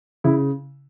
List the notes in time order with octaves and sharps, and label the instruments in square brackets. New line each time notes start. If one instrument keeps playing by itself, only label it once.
[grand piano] C#3 E4